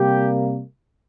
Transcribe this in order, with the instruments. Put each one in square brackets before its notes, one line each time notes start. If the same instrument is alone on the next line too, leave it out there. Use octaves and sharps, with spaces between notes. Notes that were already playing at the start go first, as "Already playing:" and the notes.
Already playing: [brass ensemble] C3 G3 A#3 G4